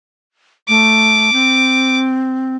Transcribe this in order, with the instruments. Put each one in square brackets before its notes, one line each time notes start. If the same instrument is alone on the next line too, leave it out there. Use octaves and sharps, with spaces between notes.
[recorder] A3 [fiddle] D6
[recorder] C4